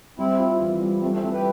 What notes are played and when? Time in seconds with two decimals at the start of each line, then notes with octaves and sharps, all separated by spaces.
0.18 G3 C4 E4
0.39 F4
0.60 E3
0.81 G3
1.02 G3 A3 C4
1.13 A3 C4
1.23 A3 C4 E4
1.33 G4 B4